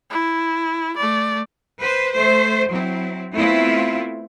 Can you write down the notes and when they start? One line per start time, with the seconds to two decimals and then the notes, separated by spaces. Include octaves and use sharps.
0.10 E4
0.96 A3 D5
1.79 B4 C5
2.13 A3 C5
2.68 F#3 C4 E4
3.36 A3 B3 C4 E4 F4